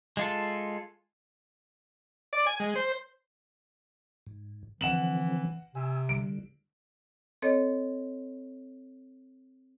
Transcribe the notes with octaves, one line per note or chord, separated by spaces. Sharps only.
G#3 F4 A4
D5
G#5
G#3
C5
G#2
D3 E3 F3 C4 F#5 E7 F#7
C3 G#5 E6
D3 G3 D7
C4 A4 C#5 D#5